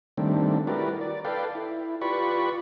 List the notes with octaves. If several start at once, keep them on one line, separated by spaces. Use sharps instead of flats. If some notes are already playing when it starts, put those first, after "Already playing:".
D#3 G3 A3 C4 D4
E4 F#4 G4 A#4 B4 D5
D5
A4 B4 D5 F5 G5
E4
F4 G4 B4 D5 B5 C#6